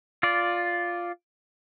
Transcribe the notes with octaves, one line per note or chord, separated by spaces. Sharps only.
F4 D5